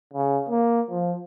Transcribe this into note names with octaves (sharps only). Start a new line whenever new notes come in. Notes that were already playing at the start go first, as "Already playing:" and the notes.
C#3
A#3
F3